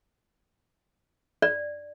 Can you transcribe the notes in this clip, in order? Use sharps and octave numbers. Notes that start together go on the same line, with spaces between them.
D5